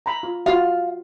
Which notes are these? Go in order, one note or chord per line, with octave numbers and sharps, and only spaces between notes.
A#5 B5
F4
F4 F#4 F5